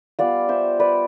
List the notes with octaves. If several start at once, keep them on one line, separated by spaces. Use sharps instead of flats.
G3 B3 F4 D5 F5
C5 E5
B4 D5